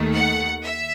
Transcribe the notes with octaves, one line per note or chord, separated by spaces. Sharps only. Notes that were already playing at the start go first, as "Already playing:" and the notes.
Already playing: D#2 D#3 A3
F#5
E5